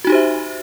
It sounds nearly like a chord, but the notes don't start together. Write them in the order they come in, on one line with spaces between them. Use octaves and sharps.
F#4 D#4 G4 C5 E5